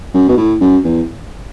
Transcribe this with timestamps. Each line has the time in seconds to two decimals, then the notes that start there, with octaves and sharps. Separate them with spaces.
0.14 F#2
0.28 B2
0.37 A2
0.61 F#2
0.84 E2